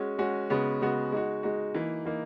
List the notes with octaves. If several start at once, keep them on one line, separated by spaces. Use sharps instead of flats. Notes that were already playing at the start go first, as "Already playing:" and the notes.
Already playing: G#3 C#4 F#4
G#3 C#4 F#4
C#3 G#3 B3 F#4
C#3 G#3 B3 F#4
G#3 D#4 F#4
G#3 D#4 F#4
E3 A#3 D#4
E3 A#3 D#4